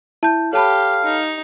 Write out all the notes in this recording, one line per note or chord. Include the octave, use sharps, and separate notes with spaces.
E4 A5 G6
G4 A4 C#5 F5 A5 B5
D#4